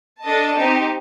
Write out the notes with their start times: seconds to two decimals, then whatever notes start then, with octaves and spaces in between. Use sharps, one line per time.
0.24 D4 A4 D#5 A5
0.55 C4 D#4 G4